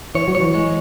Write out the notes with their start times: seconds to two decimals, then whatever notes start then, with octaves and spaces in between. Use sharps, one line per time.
0.15 E3 C#5
0.28 F#3
0.35 E3 C#5
0.54 G#3